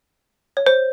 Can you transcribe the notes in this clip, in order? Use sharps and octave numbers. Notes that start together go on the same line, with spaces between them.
C#5
C5